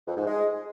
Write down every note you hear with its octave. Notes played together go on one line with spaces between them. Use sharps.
F2
G#2
G#3